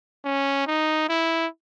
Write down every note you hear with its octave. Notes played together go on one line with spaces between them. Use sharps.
C#4
D#4
E4